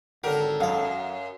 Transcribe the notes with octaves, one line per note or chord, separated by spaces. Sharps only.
G#1 D3 F#3 G4 A4 A#4
F#2 F#3 D#5 F5